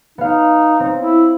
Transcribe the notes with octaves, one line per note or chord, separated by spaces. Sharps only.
B3 D#4 F5
C4
E4